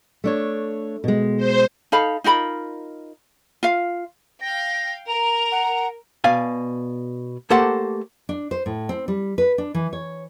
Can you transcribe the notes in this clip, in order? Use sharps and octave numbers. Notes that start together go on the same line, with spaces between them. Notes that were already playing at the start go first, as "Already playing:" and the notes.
A3 D4 C#5
B2 G#3
C5
D#4 A4 F5 B5
D#4 F4 A#4 B5
F4 F5
F5 G5 A#6
A#4 A#5 F7
F#5
B2 D5 F5 G#5
A3 A#3 G4 A4 C5 F#5
D4
C5
A2
C4
G3
B4
D4
E3
C#5